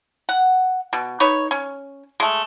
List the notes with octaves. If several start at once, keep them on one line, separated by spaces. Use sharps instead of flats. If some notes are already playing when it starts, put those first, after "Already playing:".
F#5
B2
D#4 B4 C#5
C#4
G#3 A3